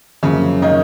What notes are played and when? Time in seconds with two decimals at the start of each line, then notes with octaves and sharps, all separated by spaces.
0.23 F#2 C#3 F3 A#3 C#4
0.62 D#3 D#4